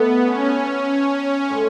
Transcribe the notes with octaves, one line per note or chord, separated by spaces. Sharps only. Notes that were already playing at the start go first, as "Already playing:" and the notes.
Already playing: A3 B3 E4 A4 D#5
C#4
A2 G#3